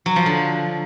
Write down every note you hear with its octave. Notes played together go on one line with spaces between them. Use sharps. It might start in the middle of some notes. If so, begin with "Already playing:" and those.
F#3
F3
D3